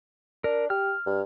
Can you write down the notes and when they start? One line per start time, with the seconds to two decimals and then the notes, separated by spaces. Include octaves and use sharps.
0.44 D4 A#4
0.70 G4 F6
1.06 G2